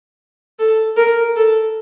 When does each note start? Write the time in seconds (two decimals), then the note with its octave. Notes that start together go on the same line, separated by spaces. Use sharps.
0.59 A4
0.97 A#4
1.36 A4